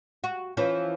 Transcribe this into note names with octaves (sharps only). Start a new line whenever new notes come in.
F#4
E3 F3 C#4